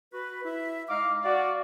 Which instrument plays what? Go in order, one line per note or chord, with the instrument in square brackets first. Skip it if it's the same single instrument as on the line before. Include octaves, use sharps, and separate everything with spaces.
[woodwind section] F#4 B4
E4 E5
[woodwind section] G#3 D#5 F6 [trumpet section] D#4 F5 D6
[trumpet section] F#4 D5 [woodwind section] F5